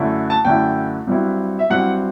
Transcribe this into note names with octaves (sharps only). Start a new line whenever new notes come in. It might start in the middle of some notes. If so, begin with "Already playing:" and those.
Already playing: F#2 D3 A3 E4
A5
F#2 D3 A3 E4 G5
G2 F#3 C4 E4
E5
G2 F#3 C4 E4 F#5